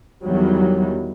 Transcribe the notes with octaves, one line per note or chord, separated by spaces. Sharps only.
E2 D#3 F#3 G3